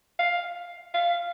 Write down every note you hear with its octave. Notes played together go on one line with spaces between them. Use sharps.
F5
F5